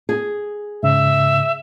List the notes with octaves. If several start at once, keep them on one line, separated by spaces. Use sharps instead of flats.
G#4
G#2 C#3 E5